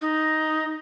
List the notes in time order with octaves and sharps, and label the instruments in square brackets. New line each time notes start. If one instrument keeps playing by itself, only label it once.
[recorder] D#4